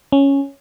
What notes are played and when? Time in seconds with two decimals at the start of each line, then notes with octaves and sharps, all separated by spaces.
0.12 C#4